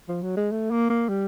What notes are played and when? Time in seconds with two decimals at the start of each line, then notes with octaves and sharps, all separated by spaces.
0.08 F3
0.22 F#3
0.37 G#3
0.51 A3
0.71 A#3
0.90 A#3
1.09 G3